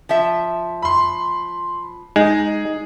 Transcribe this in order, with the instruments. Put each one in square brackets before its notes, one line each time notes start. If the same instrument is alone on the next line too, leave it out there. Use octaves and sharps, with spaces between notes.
[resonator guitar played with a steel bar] F3 E5
[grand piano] B5 C6
[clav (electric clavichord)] G#3 [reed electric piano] D#4 [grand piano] G#4